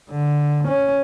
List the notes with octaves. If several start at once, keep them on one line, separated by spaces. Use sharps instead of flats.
D3
C#4